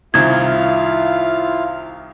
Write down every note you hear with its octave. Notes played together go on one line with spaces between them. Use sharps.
C2 D#3 E4 F4 F5 G#6